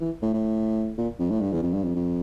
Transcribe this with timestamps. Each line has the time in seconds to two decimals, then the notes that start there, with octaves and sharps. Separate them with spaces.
0.01 E3
0.22 A2
0.34 A2
0.98 A#2
1.19 F2
1.31 A2
1.41 G2
1.53 E2
1.63 F2
1.74 G2
1.84 F2
1.96 F2